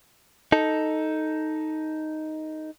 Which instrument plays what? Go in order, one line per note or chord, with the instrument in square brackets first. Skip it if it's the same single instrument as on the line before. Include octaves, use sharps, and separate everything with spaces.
[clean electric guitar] D#4 A4